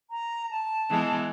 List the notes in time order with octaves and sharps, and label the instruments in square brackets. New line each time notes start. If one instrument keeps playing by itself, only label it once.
[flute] A#5
A5
[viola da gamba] E3 G#3 B3